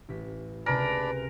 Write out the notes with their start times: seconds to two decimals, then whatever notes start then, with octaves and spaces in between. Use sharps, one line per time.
0.09 A1 B6
0.66 C#2 C3 D4 A#4 B4 D5 G#5 B5